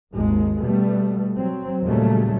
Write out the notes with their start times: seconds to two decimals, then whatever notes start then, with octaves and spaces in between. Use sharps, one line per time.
0.13 G#1 D#2 G#3
0.62 B2 G3 A3 B3
1.38 F#3 C4
1.84 D#2 A#2 C#3 F#3 G3 A3